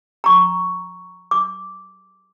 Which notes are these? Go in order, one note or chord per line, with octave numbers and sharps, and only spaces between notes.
A#5 C#6
D6